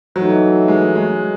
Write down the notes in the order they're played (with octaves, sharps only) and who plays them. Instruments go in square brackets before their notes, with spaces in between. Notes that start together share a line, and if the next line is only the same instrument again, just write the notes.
[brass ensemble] E3 A3 D#4 [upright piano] F#3
[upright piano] G#3
G#3